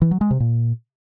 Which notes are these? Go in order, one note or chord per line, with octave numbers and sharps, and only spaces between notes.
E3
F#3
G#3
C3
A#2